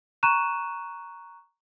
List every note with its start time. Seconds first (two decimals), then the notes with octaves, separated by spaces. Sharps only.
0.23 A#5 C#6 F#6 D#7 E7